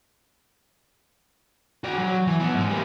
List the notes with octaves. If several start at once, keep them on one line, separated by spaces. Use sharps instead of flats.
F#4 D5
F#3
E3
F#3 B3
G#2
G3 A#3